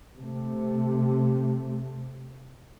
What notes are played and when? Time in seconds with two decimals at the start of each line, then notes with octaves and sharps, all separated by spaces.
0.18 C3 A3